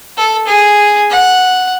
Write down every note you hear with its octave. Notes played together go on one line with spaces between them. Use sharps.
A4
G#4
F#5